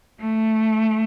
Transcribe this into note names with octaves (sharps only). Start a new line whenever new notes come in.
A3